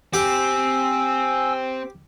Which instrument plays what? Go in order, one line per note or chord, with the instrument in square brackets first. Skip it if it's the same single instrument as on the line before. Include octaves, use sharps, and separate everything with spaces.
[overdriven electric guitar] C4 [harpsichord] G4 [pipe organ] G#5 E6